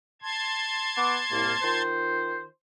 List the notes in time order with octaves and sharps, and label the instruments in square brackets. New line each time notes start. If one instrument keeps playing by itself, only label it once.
[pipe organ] A5 C6 G#6
[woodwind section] B3 F#5 D6
C2 A2 A#3
D#3 F4 C5